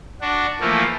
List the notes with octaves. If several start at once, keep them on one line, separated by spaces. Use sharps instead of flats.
D4 F#4
E3 F3 A3 A#3